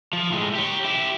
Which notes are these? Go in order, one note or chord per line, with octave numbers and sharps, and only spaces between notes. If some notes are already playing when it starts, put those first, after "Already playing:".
F3
A2 G#3
G4 C#5
E4 G4